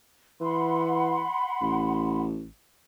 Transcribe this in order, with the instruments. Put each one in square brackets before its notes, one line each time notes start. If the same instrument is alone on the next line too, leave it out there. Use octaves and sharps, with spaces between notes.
[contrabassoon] E3 [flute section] F#5 B5 C6
[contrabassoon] A1